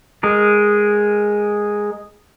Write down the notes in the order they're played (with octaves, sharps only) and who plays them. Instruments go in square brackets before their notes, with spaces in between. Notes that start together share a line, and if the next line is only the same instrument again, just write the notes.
[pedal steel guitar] G#3 G#4 A#4